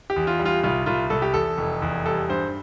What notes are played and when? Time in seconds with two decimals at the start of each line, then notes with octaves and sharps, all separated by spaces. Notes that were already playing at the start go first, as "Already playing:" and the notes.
0.10 G4
0.16 E2
0.27 F4
0.39 G3
0.45 F4
0.63 C2 F4
0.86 C2 F4
1.10 C2 A4
1.22 G4
1.34 E2 A4
1.58 F1
1.82 E2
2.06 G3 A4
2.29 G2 C5